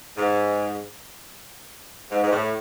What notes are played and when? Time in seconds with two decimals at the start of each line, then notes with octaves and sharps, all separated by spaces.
0.16 G#2
2.10 G#2
2.23 G#2
2.31 A2